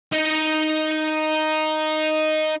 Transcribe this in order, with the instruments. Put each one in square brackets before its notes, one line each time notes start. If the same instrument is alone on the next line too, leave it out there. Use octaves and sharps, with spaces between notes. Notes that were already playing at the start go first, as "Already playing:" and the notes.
[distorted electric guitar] D#4 D#5